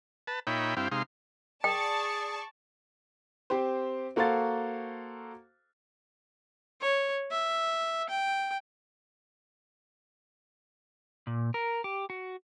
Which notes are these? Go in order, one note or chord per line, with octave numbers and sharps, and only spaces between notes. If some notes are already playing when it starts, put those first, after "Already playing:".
B4 A5
A#2 D#4 C#5 E5 G5 B5
G2 C4 E4 F5 G5
C3 G#3 D#4 F5 C6
G#4 D5 G5 A5 C#6
C4 G4 C5
A#3 F#4 A4 C5 F5 A6
C#5
E5
G5
A#2
A#4
G4
F#4